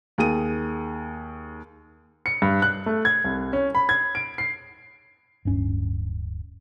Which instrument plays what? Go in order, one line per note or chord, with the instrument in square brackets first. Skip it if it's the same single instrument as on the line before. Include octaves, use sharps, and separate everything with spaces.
[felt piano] D#2 G#4 D#7
[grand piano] C#7
G2
F#6
A3
G#6
C2
C#4
B5
G#6
D7
C7
[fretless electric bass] D1 G2 C#4